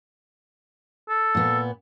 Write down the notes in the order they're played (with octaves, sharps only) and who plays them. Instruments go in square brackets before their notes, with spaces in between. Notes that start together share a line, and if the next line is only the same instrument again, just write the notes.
[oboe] A4
[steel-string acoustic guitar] A#2 B3